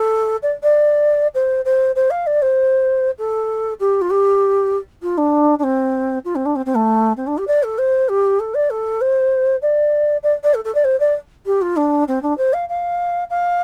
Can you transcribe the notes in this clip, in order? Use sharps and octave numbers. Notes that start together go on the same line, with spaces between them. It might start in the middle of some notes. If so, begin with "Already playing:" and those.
Already playing: A4
D5
D5
C5
C5
C5
F5
D5
C5
A4
G4
F4
G4
F4
D4
D4
C4
F4
C4
D4
C4
C4
A3
C4
D4
G4
D5
A4
C5
G4
A4
D5
A4
C5
D5
D5
D5
A4
A4
D5
C5
D5
G4
F4
D4
C4
D4
C5
F5
F5
F5